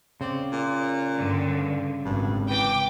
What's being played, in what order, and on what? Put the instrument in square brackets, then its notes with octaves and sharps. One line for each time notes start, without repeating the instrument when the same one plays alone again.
[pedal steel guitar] C#3 D5 [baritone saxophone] C4
[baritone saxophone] A#2
[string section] G2 D3
[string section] G#1 [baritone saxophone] G2
[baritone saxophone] E3 [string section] G5 D6